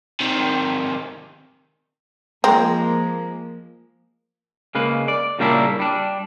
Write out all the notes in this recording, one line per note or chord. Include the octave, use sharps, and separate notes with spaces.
C3 D#3
F3 G#3 A#3 C4 A#5
C#3 G#3 A#3 B4
D5
A#2 C#3 G3 A#3 D4 E4
G3 D4